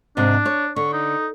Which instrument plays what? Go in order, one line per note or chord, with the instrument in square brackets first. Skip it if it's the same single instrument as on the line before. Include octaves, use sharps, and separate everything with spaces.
[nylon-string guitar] G#2 C3 G#3 [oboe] D4
[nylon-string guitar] C#5
[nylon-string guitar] D3 [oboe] C#6
[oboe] D#4